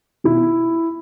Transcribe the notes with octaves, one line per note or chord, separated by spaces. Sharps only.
B2 E4